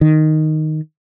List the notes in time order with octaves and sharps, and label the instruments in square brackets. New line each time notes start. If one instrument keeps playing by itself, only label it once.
[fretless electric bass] D#3